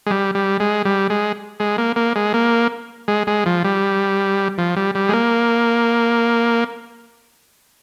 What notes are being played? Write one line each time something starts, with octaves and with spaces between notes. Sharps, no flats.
G#3
G3
G3
G#3
G3
G#3
G#3
A#3
A#3
G#3
A#3
G#3
G#3
F3
G3
F3
G3
G3
G#3
A#3